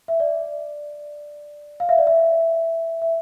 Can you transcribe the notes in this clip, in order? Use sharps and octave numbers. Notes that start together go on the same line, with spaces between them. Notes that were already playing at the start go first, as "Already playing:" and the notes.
E5
D5
F5
E5
D5
E5
E5